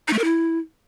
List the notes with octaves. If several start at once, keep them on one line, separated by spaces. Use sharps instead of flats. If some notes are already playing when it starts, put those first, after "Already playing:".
D#4
A3
A#4
E4